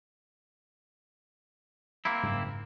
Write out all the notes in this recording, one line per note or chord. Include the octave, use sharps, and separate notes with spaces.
A#3 C4 E4
F#1 G#2